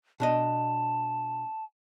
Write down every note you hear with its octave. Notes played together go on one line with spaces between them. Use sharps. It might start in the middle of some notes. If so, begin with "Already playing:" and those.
B2 D4 D#5 A5